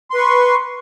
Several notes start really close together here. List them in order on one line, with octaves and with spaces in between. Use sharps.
C6 B4 C#6